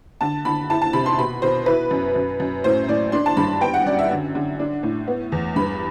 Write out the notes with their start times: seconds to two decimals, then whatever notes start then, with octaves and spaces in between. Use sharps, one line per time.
0.21 D3 A5
0.45 D3 B5
0.70 E4 A5
0.82 A5
0.93 C3 B5
1.06 C6
1.19 B2 B5
1.42 B2 C5
1.66 E4 B4
1.91 F#2
2.16 F#2
2.40 F#2
2.64 A2 C5
2.88 A2 D5
3.12 D4 C6
3.26 A5
3.37 G2 B5
3.61 B3 G5
3.74 F#5
3.86 F#2 D5
3.99 E5
4.11 D3
4.35 D3
4.59 D4
4.83 A2
5.07 B3
5.32 E2
5.56 G2 B5